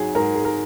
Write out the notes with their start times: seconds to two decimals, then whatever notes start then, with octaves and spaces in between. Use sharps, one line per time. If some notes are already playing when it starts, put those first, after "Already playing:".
Already playing: G#2 F#3 G#4
0.15 G#2 A#4
0.35 G#4
0.45 A#4